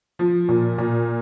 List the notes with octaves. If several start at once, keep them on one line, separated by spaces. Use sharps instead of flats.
F3
A#2
A#2